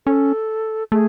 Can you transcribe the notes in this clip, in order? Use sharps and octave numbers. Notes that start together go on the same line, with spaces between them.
C#4 A4
A3 G#4